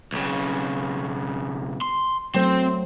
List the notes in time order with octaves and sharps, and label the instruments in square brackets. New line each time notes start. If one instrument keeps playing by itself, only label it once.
[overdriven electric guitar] B1 C#3
C6
[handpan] F#3 A3 C5 [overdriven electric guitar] C4